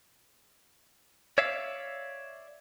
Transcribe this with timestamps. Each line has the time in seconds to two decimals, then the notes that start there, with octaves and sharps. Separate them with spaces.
1.38 C#5 D5 E5 F5